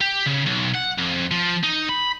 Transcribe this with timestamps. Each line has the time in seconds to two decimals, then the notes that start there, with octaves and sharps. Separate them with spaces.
0.01 G4
0.26 C#3
0.46 B1
0.74 F#5
0.98 F2
1.31 F3
1.64 D#4
1.89 B5